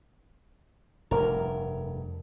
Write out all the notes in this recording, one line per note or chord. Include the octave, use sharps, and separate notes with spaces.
F1 G2 A#4